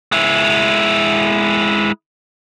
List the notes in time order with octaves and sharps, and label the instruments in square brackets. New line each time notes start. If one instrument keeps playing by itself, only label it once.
[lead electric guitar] G#3 E4